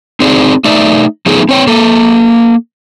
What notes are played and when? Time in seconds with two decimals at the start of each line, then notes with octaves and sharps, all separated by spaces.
0.20 C4 D#4 G#4 D5
0.64 A3 D#4 D5 E5
1.26 F3 A3 B3 D#4 G#4
1.49 C4 C#5 G5
1.67 A#3 A4